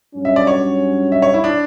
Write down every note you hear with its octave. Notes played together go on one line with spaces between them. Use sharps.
G2 F#3 C#4
E5
D5
C#5
E5
C#5
E4
D4